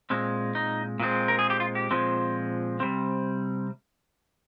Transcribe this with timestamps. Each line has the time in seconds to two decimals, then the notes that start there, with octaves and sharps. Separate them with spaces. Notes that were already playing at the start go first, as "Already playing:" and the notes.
0.10 A#2 G#3 C4
0.55 D#4
1.00 A#2 G#3 C4
1.28 A#4
1.39 G#4
1.50 G4
1.60 F4
1.75 G4
1.91 A#2 F3 G#3 C4
2.80 C3 G3 C4